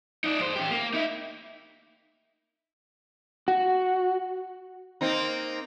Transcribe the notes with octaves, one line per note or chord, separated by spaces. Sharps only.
D#4 D5
G2 C5
C#4 G4
A#3
D#4 E4
F#4
A#3 C4 D#4